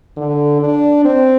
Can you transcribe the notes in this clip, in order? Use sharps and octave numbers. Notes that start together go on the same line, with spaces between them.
D3
D4
C4